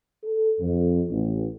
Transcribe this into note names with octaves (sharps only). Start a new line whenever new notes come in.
A4
F2
A1